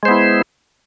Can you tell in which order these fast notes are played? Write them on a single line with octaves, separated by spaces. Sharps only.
G#3 C5 B3 E4